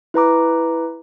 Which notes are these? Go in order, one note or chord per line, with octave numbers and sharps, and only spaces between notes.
E4 B4 A#5 D6